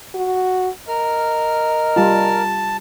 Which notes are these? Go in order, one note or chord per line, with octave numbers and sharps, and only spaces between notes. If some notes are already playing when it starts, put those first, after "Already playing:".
F#4
A#4 D#5 F6
G3 F4 A5